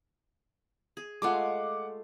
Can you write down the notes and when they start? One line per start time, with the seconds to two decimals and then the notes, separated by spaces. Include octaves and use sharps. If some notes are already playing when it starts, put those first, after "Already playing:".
0.97 G#4
1.22 G#3 A3 F4 F#5 D6